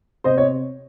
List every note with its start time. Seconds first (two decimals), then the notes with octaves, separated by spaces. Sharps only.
0.24 C3 C5 D#5
0.38 C#5